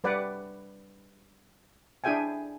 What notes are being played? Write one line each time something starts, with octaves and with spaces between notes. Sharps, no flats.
G3 B4 D5 F#5
D4 E4 G#4 E5 G5 G#5